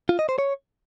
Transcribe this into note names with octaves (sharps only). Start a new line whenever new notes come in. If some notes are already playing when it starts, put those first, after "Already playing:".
F4
D#5
C5
C#5